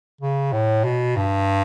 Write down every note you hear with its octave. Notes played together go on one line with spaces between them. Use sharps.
C#3
A2
B2
G2